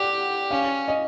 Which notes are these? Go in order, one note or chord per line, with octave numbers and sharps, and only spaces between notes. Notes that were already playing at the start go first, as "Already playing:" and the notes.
Already playing: G4 D5 F#5 G5
C#4 F5
D#5